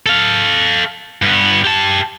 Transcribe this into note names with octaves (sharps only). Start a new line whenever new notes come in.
A4 F5
G2 B3
G4 A5